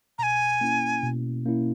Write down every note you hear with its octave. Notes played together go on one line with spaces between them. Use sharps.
B2 G#5 A#5
A#3 C#4 E4
B2
A#3 C#4 E4